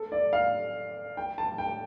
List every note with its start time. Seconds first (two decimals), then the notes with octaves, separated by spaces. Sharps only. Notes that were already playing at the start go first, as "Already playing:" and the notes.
Already playing: A4
0.12 D5
0.33 F5
1.17 G5
1.38 A5
1.58 G5